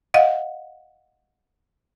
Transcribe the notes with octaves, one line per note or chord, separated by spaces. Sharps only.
D#5 F5 F#5